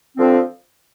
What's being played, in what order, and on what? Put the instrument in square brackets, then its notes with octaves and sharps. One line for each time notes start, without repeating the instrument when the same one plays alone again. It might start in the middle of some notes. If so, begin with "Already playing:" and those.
[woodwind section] D3 F3 C4